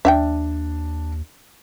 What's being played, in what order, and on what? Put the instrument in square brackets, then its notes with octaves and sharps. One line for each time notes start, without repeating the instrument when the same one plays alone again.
[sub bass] D#2 [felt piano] D4 [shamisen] E5 F5 G5